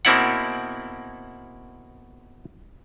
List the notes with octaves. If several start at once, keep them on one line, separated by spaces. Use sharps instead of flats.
B2 A#3 C4 E4 D5 F#5